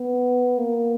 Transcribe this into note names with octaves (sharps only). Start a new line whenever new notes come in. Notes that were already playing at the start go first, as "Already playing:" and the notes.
Already playing: B3
A#3